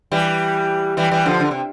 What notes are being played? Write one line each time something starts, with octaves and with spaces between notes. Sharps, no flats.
E3 G3
E3 G3
E3 G3
D3 F3
D3
C3